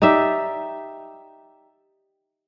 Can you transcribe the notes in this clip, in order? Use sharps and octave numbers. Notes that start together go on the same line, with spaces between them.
D#4 G4 D5 E5